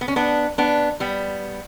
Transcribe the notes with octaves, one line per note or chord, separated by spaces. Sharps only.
B3
C#4
B3 D4
B3 D4
G3 B3